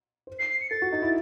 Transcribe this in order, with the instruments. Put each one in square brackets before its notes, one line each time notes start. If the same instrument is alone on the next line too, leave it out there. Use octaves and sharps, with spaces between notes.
[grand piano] C5
[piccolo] C7
C7
C#7
[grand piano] A4 [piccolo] A6
[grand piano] F#4
D#4
E4